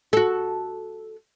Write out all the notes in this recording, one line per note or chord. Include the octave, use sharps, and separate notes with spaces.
F#4 A4